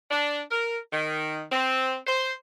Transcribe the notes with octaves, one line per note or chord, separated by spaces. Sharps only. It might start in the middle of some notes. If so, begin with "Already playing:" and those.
D4
A#4
D#3
C4
C5